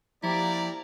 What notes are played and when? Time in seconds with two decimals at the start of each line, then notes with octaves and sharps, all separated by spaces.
0.23 F3 A#3 E4 G4 D5 A#5